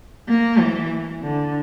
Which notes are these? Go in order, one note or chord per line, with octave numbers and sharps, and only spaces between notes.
A#3
E3
D3